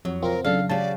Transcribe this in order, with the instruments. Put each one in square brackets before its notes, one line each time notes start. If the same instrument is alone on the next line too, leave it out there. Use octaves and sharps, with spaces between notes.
[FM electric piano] F2 [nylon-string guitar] F#3
[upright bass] C#3 [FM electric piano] C4 F4 [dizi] A#4
[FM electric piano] C#3 D4 [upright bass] E3 F#3 [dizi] A4 [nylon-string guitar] F5
[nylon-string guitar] C#3 F#4 G4 [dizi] D5 [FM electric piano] A5